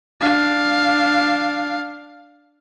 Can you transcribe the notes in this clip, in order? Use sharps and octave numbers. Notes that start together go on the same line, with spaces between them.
D4 F5